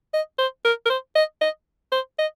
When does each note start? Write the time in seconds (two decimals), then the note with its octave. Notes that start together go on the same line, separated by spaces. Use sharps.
0.14 D#5
0.39 C5
0.65 A#4
0.86 A#4
0.90 C5
1.16 D#5
1.41 D#5
1.92 C5
2.19 D#5